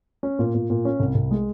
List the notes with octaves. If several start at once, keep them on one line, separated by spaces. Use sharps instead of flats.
C#4
A#2
A#2
A#2
C#4
C2
C2
G#3